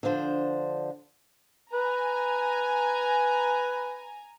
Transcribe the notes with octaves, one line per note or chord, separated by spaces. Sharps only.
D3 F3 D4 C5
B4 G#5 A#5